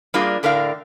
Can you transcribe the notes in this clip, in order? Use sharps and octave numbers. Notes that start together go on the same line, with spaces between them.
G3 A#3 D4 F4 G#4
A2 D3 A#4 D5 F5